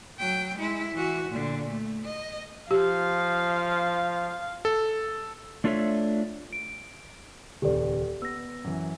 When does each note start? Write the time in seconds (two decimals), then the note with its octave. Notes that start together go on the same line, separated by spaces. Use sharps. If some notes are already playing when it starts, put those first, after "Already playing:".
0.19 F#3 G5
0.58 G#3 E4
0.95 E3 F#4
1.30 A#2 D3
1.69 A3
2.05 D#5
2.71 F3 G4 F5
4.65 A4
5.64 A3 D4 F4 A4 C#5 E5
6.53 D7
7.62 D#1 C#2 G4 A4 B4 D5
8.22 B3 E6 A#6
8.64 F#2 E3